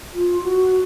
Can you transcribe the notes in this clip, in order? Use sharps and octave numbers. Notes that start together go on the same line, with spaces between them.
F4
F#4